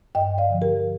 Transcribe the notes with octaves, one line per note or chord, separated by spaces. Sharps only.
G2 D#5 G5
D5 F5
D3 F3
G4 A#4